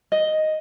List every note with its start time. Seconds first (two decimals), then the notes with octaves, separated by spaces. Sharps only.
0.12 D#5